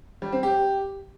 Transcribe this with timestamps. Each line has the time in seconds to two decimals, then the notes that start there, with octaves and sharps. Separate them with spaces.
0.22 G3
0.32 C4
0.43 G4